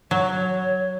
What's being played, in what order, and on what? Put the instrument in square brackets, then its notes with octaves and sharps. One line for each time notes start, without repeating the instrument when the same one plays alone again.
[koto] F#3 [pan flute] C#5